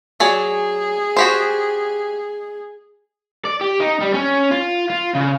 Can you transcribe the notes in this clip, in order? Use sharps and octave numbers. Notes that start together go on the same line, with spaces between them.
F#3 G#4 D5 G#5
F#4 G4 C5
D5
G4
D#4
G3
C#4
F4
F4
C#3